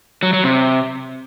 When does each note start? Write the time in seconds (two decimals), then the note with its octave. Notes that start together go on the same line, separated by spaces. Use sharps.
0.23 F#3
0.33 F#3
0.44 C3